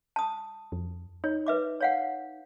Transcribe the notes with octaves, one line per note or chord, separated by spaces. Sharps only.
A5 D#6
F2
D#4 C#5
B4 E5 D6
C#5 F5 F#5